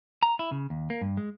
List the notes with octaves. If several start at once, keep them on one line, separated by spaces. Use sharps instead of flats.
A#5
E4
C#3
D#2
A#3
G2
G#3